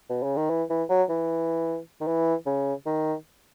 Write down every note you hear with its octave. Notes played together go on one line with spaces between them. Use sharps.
B2
C#3
D#3
E3
E3
F#3
E3
D#3
E3
C#3
D#3